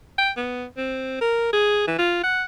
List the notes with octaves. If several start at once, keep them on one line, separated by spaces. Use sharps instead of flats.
G5
B3
C4
A#4
G#4
E3
F4
F#5